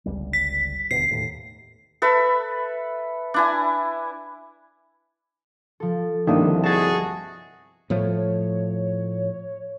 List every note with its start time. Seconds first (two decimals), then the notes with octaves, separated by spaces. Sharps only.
0.06 G1 C#2 G3
0.33 B6
0.91 D#1 D2 B2 C7
1.11 D#2 A2
2.02 A4 B4 E5
3.34 D4 E4 G#5
5.80 F3 A4
6.27 G1 C2 D#3 A#3 D4 D#5 E5
6.64 F#4 G#4 A5 A6
7.90 A2 F3 A3 C#5